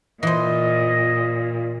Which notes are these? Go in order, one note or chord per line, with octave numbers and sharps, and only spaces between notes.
A#2 E3 C5 D#5